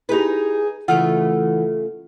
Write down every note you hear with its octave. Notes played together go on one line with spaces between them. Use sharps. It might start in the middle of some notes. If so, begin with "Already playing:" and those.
D#4 E4 G4 G#4 B4
C#3 E3 A3 F4 F#5 E6 F6